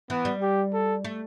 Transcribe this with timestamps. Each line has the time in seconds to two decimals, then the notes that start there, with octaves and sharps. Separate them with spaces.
0.10 E3 B3
0.25 G3
0.42 G4
0.73 A4
1.04 A3